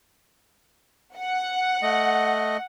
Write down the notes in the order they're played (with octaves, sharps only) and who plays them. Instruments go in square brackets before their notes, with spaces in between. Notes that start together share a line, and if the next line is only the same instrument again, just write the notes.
[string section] F#5
[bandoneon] A3 D#5